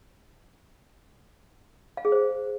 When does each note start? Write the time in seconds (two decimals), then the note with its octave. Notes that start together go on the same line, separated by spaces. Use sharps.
1.97 F5
2.05 G#4
2.12 C5